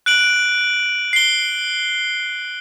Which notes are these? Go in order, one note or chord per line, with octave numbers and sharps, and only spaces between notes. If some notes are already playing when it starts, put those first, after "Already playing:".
F#6 D7 F#7
C7 G7